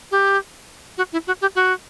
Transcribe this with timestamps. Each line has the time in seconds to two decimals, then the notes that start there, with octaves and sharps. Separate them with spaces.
0.11 G4
0.98 F#4
1.12 E4
1.27 F#4
1.41 G4
1.55 F#4